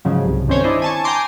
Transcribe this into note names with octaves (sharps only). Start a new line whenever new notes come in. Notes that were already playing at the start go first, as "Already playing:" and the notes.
G#2 C#3 F3 F#3
C2
G2 D#3 C4 C#4 C5 C#5
D4 E4 C5 D#5
G#5 A5 C#6
G5 G#5 A#5 C6 D6